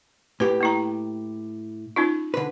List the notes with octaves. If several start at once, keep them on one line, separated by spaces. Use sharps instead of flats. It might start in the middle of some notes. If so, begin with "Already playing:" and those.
A2 G4 B4
A#3 E4 A#5
C#4 D#4 F4
D3 B4